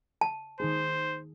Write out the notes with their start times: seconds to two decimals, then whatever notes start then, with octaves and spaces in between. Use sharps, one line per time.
0.21 A5
0.60 D#3 D#4 G#4 C5